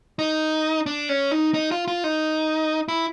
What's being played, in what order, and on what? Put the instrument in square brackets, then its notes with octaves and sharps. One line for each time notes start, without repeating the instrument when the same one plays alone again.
[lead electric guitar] D#4
D4
C#4
D#4
D#4
F4
F4
D#4
E4